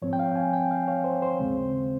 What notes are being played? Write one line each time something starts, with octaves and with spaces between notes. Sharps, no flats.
G#2 F3 C4 C#5
G5
F5
G#5
G5
F5
C#5
C5
C5
D#2 C#3 G#3 C4